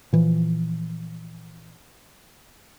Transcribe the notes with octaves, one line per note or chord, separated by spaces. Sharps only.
A#2 E3 F3